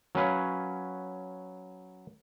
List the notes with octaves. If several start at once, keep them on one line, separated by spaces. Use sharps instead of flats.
F#3 C#4 B4 F5